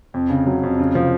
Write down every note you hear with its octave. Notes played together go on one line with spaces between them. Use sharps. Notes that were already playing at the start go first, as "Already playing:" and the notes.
F2
C#3
F#3
F2
C#3
F3